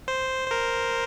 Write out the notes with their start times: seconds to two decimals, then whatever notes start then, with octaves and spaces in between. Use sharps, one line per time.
0.08 C5
0.47 A#4 C5